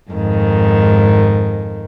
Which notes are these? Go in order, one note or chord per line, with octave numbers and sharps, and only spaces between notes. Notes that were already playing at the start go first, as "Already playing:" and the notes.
F2 G#2 D#3